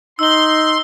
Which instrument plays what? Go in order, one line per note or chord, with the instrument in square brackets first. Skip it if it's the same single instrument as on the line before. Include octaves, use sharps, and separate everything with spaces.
[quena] D#4 [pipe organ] C6 [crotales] E6 G7